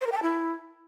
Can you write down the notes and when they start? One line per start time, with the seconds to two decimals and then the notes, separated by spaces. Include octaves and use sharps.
0.01 C5
0.06 A#4
0.12 G5
0.17 A5
0.22 E4